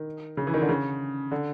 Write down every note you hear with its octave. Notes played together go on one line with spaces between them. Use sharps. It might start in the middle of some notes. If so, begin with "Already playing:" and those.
Already playing: D#3
C#3
E3
D#3
D3
C#3
D3